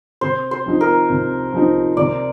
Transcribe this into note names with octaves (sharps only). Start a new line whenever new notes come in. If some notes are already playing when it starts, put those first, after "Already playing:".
C3 C5
C5
F3 C4 D#4
A#4
C3
F3 C4 D#4
C3 D5